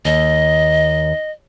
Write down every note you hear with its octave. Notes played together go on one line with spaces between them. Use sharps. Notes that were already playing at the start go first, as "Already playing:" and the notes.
D#2 D#5